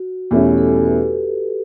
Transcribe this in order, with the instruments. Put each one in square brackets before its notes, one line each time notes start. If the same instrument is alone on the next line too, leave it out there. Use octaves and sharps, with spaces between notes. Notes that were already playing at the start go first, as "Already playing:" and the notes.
Already playing: [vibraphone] F#4
[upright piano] E2 B2 A3 C#4 E4 [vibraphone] G4
[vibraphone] A4
B4